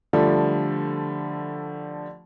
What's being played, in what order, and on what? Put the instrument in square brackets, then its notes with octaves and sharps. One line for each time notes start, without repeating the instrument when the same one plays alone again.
[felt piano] D3 F3 G3 A3